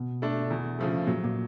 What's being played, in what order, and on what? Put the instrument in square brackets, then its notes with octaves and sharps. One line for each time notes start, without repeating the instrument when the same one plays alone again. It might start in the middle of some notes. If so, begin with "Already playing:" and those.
Already playing: [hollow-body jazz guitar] B2
[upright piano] A3 D4
E2
C#3 F3 A3
[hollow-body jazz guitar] A#2 [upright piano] F#3
[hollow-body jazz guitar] A#2